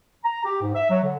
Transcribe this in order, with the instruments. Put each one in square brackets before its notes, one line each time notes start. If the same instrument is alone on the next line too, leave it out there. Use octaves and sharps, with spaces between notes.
[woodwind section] A#5
G4
G#2
E5
F#3
D3